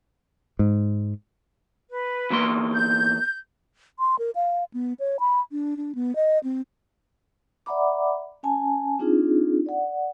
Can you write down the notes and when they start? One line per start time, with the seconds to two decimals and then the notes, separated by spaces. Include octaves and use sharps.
0.59 G#2
1.90 B4
2.30 E2 A#3 C6
2.73 G6
3.99 C6
4.19 A#4
4.35 F5
4.74 B3
4.99 C#5
5.20 B5
5.52 D4
5.77 D4
5.95 B3
6.16 D#5
6.44 C4
7.66 D5 E5 F#5 A#5 B5 D6
8.43 C#4 G#5 A5
8.99 C4 D4 D#4 F4 G#4
9.66 D5 F#5